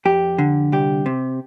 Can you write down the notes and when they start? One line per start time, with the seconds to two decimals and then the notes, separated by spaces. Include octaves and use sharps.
0.05 F2 G4
0.38 D3
0.72 C2 G4
1.06 C3